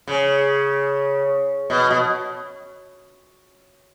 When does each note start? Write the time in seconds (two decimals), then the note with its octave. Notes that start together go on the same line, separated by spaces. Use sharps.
0.08 C#3
1.70 B2
1.91 B2